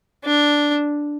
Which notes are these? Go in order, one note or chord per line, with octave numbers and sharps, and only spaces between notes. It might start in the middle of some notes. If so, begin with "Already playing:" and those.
D4